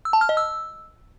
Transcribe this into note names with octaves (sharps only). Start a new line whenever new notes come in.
E6
A5
F6
D#5
E6